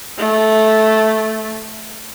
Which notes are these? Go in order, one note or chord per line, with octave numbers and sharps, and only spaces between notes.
A3